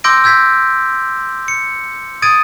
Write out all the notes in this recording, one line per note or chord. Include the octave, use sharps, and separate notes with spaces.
C6 D6 E6 G6 A#6 D7
E6 G6 G#6 B6
C#7
D#6 G#6 A6 D7 D#7